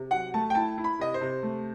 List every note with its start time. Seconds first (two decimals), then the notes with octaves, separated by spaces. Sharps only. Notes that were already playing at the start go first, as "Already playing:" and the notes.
Already playing: C3
0.11 F#3 F#5
0.34 A3 A5
0.50 G5
0.55 E4 A5
0.78 E4
0.84 B5
0.99 C3 D#5
1.14 C5
1.21 C3
1.43 A3